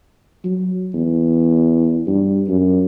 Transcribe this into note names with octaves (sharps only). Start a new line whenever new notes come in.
F#3
E2
G2
F#2